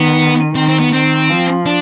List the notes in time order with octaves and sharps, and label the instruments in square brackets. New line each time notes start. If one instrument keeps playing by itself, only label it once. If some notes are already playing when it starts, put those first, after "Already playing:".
Already playing: [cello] D#3 [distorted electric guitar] B3
[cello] D#3 [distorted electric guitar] C4
[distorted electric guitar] C4
B3
[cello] D#3 [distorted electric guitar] C4
[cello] F3
[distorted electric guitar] D4